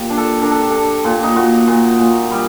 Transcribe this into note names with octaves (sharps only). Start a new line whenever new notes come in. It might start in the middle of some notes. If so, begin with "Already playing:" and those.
Already playing: A#2 G4
D4
A4
D4 A#4
A4
G4
D4 A4
A#2
D#4
A#2 F#4
A#2
A#2
G3